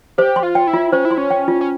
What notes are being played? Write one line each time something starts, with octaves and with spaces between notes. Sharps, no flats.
G4 C5
C6
F4
G5
E4
F4
C#4 C5
E4
C6
C#4
G5
F4
C#4